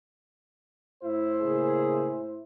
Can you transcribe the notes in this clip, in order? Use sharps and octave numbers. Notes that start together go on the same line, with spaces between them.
A2 E4 C5
C#3 A#3 G#4